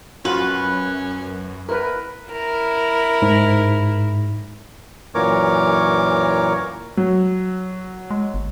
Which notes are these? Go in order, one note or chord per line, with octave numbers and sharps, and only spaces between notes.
F#2 C#4 F4 F#4 B4
E4 A#4 B4
E4 A#4
G#2
F#2 A#2 E3 A#4 C#5 D6
F#3
G#3
G1